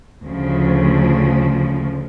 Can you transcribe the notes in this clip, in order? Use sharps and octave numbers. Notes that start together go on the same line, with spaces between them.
D2 C#3 F3